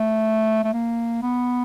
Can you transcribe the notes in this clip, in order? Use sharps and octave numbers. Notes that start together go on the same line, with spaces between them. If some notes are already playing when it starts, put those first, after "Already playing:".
Already playing: A3
A3
A#3
B3